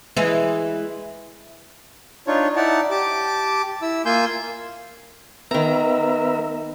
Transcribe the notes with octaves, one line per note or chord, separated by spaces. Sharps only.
E3 G#3
D4 D#4 F4 C#5
D#4 E4 D5 F#5 A5
G4 A5 D6
E4 E6
A#3 F4 G#5 C6 E6 G6
D#3 B3 A#4 E5 A#5